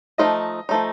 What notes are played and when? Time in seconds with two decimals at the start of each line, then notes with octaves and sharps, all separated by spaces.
0.18 F3 A3 D#4 D#5
0.69 F3 A3 D#4